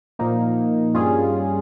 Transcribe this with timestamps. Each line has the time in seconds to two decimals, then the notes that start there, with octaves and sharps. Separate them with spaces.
0.19 A#2 F3 A#3 D#4
0.94 G2 G3 C#4 F4 G#4